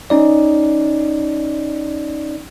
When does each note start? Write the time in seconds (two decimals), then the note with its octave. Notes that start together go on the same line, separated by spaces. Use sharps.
0.10 C#4 D#4 D5